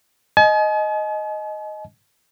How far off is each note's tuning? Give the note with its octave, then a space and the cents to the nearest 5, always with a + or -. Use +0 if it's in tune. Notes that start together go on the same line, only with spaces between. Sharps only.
D#5 +0 G#5 +45